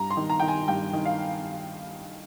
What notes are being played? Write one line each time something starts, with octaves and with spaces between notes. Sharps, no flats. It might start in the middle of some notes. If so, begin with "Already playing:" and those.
Already playing: G2 A#5
C6
D#3
A#5
D#3 G5
G#5
G2 G5
D#3
F5